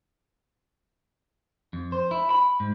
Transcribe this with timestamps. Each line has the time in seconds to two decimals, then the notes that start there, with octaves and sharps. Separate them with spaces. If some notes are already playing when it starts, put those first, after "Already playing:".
1.73 F2
1.92 C5
2.11 E4
2.30 B5
2.60 G#2